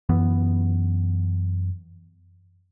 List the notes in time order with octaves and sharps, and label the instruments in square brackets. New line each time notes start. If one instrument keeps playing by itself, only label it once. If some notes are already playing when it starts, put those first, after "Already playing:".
[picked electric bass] F#2 E3 B3